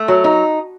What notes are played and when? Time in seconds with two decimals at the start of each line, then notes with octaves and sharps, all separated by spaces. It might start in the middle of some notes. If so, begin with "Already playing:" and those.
Already playing: A3
0.08 F#3
0.24 D#4